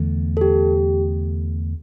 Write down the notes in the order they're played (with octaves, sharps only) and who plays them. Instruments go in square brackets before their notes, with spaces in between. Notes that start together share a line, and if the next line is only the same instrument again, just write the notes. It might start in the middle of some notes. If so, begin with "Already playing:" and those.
Already playing: [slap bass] E2 D3 A3
[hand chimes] A4
G4